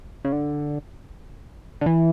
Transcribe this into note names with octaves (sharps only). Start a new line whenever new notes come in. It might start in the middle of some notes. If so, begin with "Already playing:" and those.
C#3
D3
D3
E3